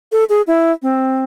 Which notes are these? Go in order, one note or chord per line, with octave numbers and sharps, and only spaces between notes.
A4
G#4
E4
C4